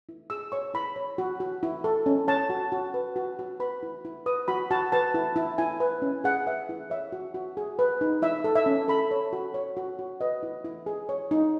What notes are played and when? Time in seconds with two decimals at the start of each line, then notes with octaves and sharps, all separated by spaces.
0.09 E4
0.30 G#4 E6
0.52 C#5 C#6
0.74 E4 B5
0.96 C#5
1.18 F#4
1.40 F#4
1.63 E4
1.84 A4
2.06 C#4
2.28 C#5 A5
2.50 F#4
2.72 F#4
2.94 B4
3.16 F#4
3.39 F#4
3.60 B4 B5
3.83 E4
4.05 E4
4.26 B4 D#6
4.48 F#4 B5
4.71 F#4 A5
4.92 B4 A5
5.14 E4
5.36 E4
5.58 E4 G#5
5.80 B4
6.02 C#4
6.24 G#4 F#5
6.46 B4 E5
6.69 E4
6.90 C#5 E5
7.12 F#4
7.34 F#4
7.57 G#4
7.79 B4
8.01 D#4
8.22 E4 E5
8.44 A4
8.55 E5
8.66 C#4
8.88 A4 B5
9.11 C#5
9.33 F#4
9.54 C#5
9.77 F#4
9.99 F#4
10.21 B4 D#5
10.43 E4
10.65 E4
10.86 G#4
11.09 C#5
11.31 D#4